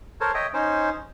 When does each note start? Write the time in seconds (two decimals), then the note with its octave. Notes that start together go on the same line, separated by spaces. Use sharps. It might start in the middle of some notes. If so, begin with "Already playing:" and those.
0.21 A4 A#4 C5 C#5
0.34 C#5 D#5 E5 G5
0.54 C#4 D#4 C5